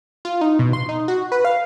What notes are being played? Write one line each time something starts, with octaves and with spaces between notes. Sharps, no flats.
F4
D#4
B2
C6
D#4
F#4
B4
F5